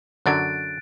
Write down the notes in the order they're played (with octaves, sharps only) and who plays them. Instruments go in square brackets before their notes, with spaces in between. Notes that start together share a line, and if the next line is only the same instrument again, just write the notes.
[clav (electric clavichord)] F#2 D3 F#3 [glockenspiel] F#6 A6 D7